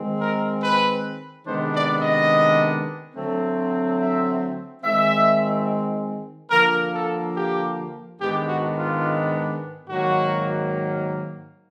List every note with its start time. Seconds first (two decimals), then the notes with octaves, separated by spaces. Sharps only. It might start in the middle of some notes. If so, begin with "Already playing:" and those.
Already playing: D#3 G#3 C4
0.19 A#4
0.62 B4
1.46 C3 D#3 G#3 B3 D4 C5
1.75 D5
2.02 D#5
3.15 D3 F#3 A3 C4
3.99 E5
4.82 D#3 G#3 C4 E5
6.50 D3 F3 A#3 A#4
6.93 A4
7.36 G4
8.19 G#2 D#3 G#3 B3 D4 G4
8.47 F#4
8.76 F4
9.87 G#2 D#3 F#3 A#3 F#4